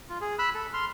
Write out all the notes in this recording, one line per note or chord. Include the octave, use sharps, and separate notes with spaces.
F4
G#4
B5 E6 F#6
A4
C6 F6